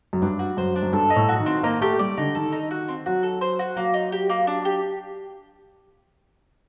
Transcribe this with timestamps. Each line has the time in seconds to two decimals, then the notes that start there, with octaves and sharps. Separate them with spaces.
0.13 F#2
0.22 G2 D4
0.39 F#4
0.57 F#2 C5
0.76 D4
0.83 F#2
0.92 G2 A4
1.10 D#4
1.16 A2
1.29 F#4
1.40 D#3
1.46 C4
1.63 A#3 D#4
1.81 A3 G4
1.99 G3 D5
2.17 D3 D#4
2.35 D#3 A4
2.52 D#4
2.71 F#4
2.88 C4
3.06 F#3 F#4
3.23 A4
3.41 C5
3.59 F#4
3.76 F#3 A#3
3.94 D#4
4.12 G4
4.29 A#3
4.47 D4
4.65 G4